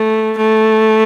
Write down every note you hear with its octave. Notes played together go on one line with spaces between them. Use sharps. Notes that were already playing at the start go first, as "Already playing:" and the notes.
Already playing: A3
A3